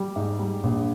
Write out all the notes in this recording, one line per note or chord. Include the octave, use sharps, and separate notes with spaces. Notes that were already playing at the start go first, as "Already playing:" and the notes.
Already playing: G3
G#2
G3
A#1